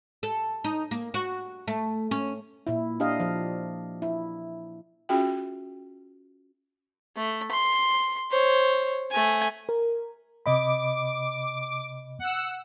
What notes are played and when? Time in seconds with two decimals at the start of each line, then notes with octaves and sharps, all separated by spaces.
0.23 A4
0.64 D#4
0.91 A#3
1.14 F#4
1.68 A3
2.11 C#4
2.67 A#2 E4
3.00 D4 G4 D#5 F5
3.20 F3
4.02 E4
5.09 C#4 F4 F#4 G#4 E5 G5
7.17 A3
7.51 C6
8.31 C5 C#5
9.11 A3 G#5
9.69 A#4
10.46 C3 D#5 B5 D6
12.19 F#5 E6